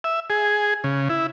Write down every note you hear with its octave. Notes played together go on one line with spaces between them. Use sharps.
E5
G#4
C#3
E4